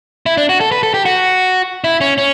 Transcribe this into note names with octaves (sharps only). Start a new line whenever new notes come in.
E4
D4
F#4
A4
B4
A4
G4
F#4
E4
C#4
C#4